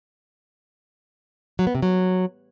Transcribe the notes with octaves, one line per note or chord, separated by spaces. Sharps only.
F#3
B3
C3
F#3